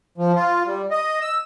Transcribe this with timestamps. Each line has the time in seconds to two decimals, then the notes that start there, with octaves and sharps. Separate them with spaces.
0.18 F3
0.36 F4
0.66 G3
0.91 D#5
1.21 E6